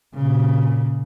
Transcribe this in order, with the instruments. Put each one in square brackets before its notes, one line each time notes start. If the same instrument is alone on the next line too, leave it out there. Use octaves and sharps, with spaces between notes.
[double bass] A#2 C#3